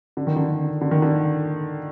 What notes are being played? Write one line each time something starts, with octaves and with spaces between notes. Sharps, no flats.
D3
D#3
D3
D3
D#3
D3